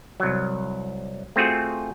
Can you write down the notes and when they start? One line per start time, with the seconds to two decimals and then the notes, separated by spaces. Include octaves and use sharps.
0.20 C2 F#3
1.36 A3 C4 F4 F#4 G#4